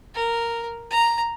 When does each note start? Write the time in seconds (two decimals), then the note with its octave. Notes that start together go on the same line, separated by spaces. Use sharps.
0.14 A#4
0.90 A#5